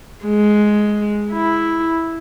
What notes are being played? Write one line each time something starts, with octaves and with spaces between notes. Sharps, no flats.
G#3
E4